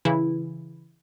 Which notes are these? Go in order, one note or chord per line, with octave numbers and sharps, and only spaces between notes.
C#3 E3 E4